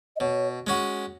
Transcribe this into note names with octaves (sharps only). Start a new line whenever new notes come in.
D#5
B2 C#5
G#3 C#4 F#4